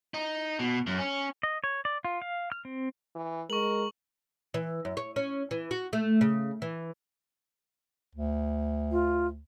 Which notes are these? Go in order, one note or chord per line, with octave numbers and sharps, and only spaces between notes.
D#4
B2
F#2
C#4
D#5
C#5
D5
F4
F5
F6
C4
E3
G#3 A#4 C#6 F#7
E3
F#2
C#5
C#4
E3
F#4
A3
C#3
E3
D2
F4